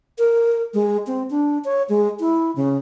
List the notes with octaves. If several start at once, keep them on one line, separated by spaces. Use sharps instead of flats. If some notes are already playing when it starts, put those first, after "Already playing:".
A#4
G#3
C4
D4
C#5
G#3
E4
C#3